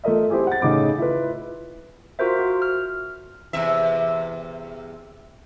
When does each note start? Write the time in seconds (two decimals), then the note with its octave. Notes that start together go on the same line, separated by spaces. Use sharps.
0.04 A3 F4 A#4 D#5 E5
0.30 C4 E4 G4 G#4
0.47 F#5 A6
0.62 A2 C#3 D#4 D6
0.98 E4 F4 B4
2.19 F4 F#4 A#4 C5 E5
2.39 F#4
2.62 F6
3.53 E2 C3 E5